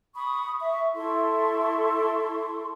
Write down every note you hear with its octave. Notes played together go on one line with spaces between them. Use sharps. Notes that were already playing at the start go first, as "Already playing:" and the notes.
B5 C#6 D#6
E5 C#6
E4 A4 C6 C#6